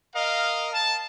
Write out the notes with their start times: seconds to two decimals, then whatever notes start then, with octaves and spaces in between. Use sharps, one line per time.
0.14 A#4 D#5 F5
0.74 A5